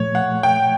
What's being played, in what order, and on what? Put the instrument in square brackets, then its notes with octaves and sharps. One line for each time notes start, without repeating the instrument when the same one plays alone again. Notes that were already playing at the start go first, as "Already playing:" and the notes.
Already playing: [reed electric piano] A#2 F3 A3 [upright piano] C#5
[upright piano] F#5
G5